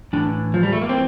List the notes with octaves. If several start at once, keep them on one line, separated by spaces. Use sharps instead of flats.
A2 E3 D4
F3
G3
A3
A#3
E3 C4